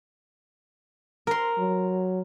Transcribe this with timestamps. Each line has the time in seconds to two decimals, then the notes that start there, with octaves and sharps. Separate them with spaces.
1.27 A#4 C6
1.58 F#3